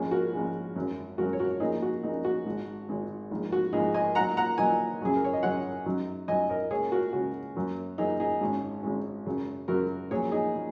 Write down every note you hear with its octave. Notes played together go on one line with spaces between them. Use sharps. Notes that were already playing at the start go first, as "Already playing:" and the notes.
Already playing: A#1 G#2 G#3 C#4
F#4 A#4
A#1 G#2 G#3 C#4
G#1 F#2 F#3 C#4
G#1 F#2 F#3 C#4 F#4 A#4
C#5
F#4 A#4
A#1 A#2 A#3 C#4 D#4 G#4
F#4
A#1 A#2 A#3 C#4 D#4
F#4
G#1 G#2 G#3
G#1 G#2 G#3
A#1 G#2 D#3
F#4
A#1 G#2 D#3 D#4 G#4
D#5 G#5
A#2 F#3 D#4 F#5 A#5
F#5 A#5
A#2 F#3 D#4 D#5 G#5
F#2 C#3 F#3 C#4 G#4
A#4
C#5
D#5
F#2 C#3 F#3 C#4 C#5 F#5
F#2 F#3 D#4
F#2 F#3 D#4 D#5 G#5
A#4 D#5
C#2 C#3 A#3 C#4 G#4 C#5
F#4 A#4
C#2 C#3 A#3 C#4 F#4
F#2 F#3 A#3 C#4
F#2 F#3 A#3 C#4 D#4 G#4
D#4 G#4
G#1 G#2 G#3 C#4
G#1 G#2 G#3 C#4
F#2 C#3 F#3
F#2 C#3 F#3 F#4 A#4
A#1 A#2 F#3 C#4 G#4 C#5
D#4 G#4
A#2